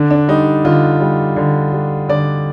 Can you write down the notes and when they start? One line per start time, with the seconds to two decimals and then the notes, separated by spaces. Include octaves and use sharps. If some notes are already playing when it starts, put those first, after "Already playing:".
Already playing: D3 D4
0.11 D4
0.28 G3 D#4
0.65 D3 F4
1.00 G3
1.36 D3
1.73 G3
2.09 D3 D5